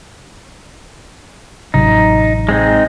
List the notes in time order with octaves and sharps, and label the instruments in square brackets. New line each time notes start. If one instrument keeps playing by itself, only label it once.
[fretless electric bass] A1 C3 F#3 [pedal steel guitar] D#4
[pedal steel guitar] G#3 C4 D#4